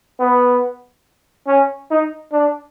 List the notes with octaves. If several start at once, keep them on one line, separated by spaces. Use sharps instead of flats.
B3
C#4
D#4
D4